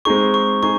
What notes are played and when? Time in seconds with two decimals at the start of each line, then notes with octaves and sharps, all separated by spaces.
0.05 G#3 C4 D#4 G#4 C#6
0.34 C#6
0.63 D#4 G#4 C#6